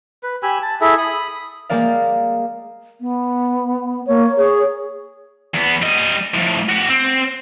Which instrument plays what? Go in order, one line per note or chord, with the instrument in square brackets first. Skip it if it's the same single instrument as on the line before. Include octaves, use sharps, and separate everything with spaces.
[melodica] B4
G4 G#5 B5 E6
A5
E4 G#4 A4 E5
B5 D#6
[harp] G3 G#3 A#3 D5 F5
[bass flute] B3
[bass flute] A#3 [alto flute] C#5
[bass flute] G#4 [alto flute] C#5
[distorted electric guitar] E2 B3
G3 D#5
F2 A2
F#4 G4
C4